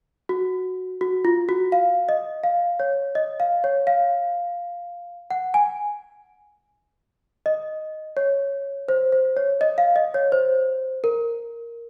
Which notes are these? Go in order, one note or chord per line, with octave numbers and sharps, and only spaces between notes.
F#4
F#4
F4
F#4
F5
D#5
F5
C#5
D#5
F5
C#5
F5
F#5
G#5
D#5
C#5
C5
C5
C#5
D#5
F5
D#5
C#5
C5
A#4